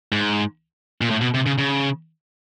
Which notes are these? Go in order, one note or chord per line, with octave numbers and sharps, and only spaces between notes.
G#2
A#2
A2
B2
C3
C#3
C#3